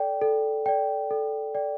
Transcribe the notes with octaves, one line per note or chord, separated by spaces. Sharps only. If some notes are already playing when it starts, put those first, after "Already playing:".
Already playing: A4 D5 G5
A4
D5 G5
A4
D5 G5